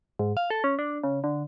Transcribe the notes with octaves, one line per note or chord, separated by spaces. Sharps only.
G#2
F5
A4
C#4
D4
C#3
D3